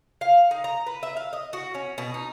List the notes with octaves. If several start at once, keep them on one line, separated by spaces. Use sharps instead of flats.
F5
D#4
A#5
B4
E5
F5
D#5
F#4
C#4
B2
D#4